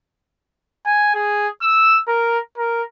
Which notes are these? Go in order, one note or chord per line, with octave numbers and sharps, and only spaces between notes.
G#5
G#4
E6
A#4
A#4